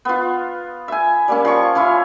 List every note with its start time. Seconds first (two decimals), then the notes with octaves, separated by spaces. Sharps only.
0.05 B3 F4
0.88 E5 G#5
1.28 G3 A#3 C#4
1.45 F3 C#6
1.75 F3 C#4 E4 F5